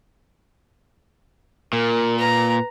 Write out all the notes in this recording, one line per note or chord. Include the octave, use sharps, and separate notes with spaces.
A#2 A#4
B4 A#5